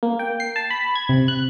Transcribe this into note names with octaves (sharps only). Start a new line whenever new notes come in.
A#3
G5
C7
A5
B5
G#6
C3
F#6